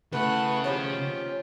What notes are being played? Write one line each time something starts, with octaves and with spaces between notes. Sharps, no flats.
C#3 A3 E4 B4 F#5
D#3 F3 C#4 F4 G4